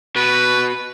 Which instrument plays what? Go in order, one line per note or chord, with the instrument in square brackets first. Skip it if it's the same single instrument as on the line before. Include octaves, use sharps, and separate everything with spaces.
[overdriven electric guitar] B2 [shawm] B4